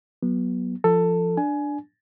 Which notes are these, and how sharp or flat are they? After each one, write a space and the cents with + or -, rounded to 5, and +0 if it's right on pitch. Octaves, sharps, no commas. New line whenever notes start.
F#3 -5 B3 -25
F3 -15 A4 +15
D4 +0 G#5 +20